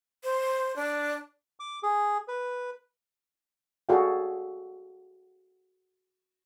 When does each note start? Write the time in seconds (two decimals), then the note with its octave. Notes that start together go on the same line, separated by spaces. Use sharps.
0.24 C5
0.76 D4
1.60 D6
1.83 G#4
2.28 B4
3.89 F#4 G#4 A4 D5 F5 G5